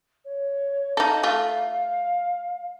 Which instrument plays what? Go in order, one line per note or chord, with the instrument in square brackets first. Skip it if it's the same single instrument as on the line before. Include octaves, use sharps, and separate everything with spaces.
[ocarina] C#5
[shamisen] D#4 A4 [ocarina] F5
[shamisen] A3 F4